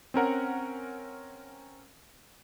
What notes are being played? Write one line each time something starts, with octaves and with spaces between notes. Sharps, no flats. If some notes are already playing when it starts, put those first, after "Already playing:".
C4 C#4 A#4 F#5